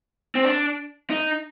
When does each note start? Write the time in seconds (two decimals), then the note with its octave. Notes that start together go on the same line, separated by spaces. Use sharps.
0.35 C4
0.45 D4
1.10 D#4